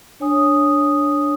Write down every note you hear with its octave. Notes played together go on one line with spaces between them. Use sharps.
D4 C#5 G#5 D#6